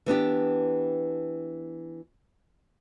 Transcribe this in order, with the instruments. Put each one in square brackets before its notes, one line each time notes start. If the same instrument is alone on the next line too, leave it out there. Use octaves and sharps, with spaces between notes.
[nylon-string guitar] E3 B3 D4 G4